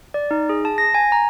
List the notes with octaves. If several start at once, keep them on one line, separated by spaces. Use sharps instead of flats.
D5
D#4
G#4
A5
A#6
G#5
A#5